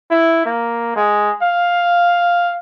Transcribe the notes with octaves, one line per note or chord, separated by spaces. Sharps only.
E4
A#3
G#3
F5